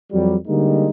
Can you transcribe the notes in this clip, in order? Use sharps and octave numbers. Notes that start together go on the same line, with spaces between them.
F2 F#3 G3
D3 G3 G#3 A#3 D#4